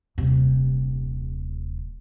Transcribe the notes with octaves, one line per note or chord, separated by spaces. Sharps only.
D#1 C3